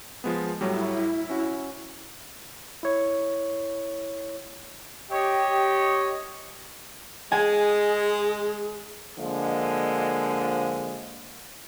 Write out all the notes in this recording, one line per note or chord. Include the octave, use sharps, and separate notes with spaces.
F3 G#3 B3
A2 F#3 G3 E4
C#4 F#4
E4 C#5
G4 C#5 D#5
G#3 G#4 G#5
D3 F3 G#3 A#3